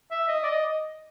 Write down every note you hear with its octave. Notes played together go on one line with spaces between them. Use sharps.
E5
D#5
D5
D#5